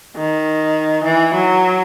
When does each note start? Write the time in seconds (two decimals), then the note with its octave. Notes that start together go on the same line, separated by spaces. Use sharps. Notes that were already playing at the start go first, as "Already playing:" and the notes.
0.16 D#3
1.04 E3
1.34 F#3